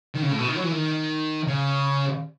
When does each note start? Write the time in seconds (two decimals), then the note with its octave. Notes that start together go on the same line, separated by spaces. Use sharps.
0.15 D#3
0.23 C#3
0.32 A2
0.39 B2
0.48 D#3
0.56 F#3
0.64 E3
0.72 D#3
1.47 C#3